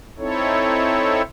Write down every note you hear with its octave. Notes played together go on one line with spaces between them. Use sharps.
C4 D#4 E4 A4 C#5